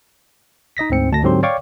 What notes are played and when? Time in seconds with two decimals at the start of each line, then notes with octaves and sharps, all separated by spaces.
0.77 D#4 D#5 A#6 B6
0.90 D2 G#2 C4 C#7
1.11 D2 A5 A#6
1.23 G#2 D3 F#3 C4 G4 C6
1.43 C#5 D5 F5 G5 C#6 D6